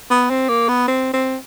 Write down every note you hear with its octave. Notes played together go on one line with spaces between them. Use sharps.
B3
C4
A#3
B3
C4
C4